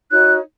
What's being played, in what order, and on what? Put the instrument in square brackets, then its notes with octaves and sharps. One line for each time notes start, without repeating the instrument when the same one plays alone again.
[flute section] D#4 F#4 C#5 F#6